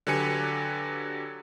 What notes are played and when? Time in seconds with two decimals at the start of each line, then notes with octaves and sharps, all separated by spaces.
0.07 D3 F#3 G4 B4 G#5 C#7